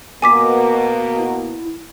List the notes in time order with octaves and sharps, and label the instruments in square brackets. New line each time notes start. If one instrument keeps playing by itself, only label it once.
[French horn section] B2 A#3 [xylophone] G#5 D6 B6
[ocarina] E4